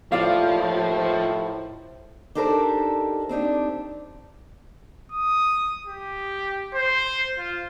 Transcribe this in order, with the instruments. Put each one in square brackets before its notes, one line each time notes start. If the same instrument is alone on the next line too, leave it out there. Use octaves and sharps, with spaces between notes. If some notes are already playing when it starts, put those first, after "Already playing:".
[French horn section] D#2 C5 [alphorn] A2 [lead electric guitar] F3 [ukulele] F4 D5 F5
[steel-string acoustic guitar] D4 D#4 G4 A4 A#4 C5
C4 D4 D#4 G4
[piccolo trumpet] D#6
G4
C5
F4